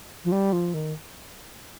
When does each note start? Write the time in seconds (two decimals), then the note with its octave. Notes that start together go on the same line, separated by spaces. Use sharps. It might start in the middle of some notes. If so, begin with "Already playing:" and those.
0.25 F3
0.32 G3
0.53 F3
0.74 D#3